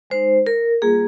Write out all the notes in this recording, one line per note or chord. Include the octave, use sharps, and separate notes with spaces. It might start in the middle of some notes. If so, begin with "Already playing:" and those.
G#3 D#4 C5
A#4
G3 A#3 F4 G#4